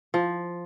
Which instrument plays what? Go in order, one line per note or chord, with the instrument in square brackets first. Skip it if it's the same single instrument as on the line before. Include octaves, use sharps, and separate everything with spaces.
[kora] F3